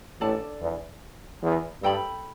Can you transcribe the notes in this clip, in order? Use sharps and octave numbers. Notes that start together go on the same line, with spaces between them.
A1 A2 D4 A4 D5 A5
E2
E2
G2 A4 G5 B5